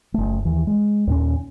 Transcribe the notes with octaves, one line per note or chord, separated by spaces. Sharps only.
F#1 A3
D#2 E3
G#3
D#2 A#2 C#4